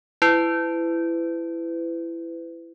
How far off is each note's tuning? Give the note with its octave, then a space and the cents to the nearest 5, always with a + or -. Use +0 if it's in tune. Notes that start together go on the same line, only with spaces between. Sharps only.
E4 +20 B4 +35